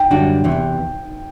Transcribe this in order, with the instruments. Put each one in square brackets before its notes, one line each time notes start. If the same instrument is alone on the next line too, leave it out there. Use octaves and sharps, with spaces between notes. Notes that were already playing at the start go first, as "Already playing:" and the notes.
Already playing: [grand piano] G5
[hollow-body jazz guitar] F#2 D3 G3 D4 F#4
E2 C3 E3